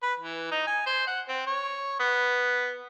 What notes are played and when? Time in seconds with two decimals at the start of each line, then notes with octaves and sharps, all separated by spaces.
0.03 B4
0.20 E3
0.51 D#4
0.67 G#5
0.86 C5
1.07 F#5
1.28 C4
1.47 C#5
2.00 B3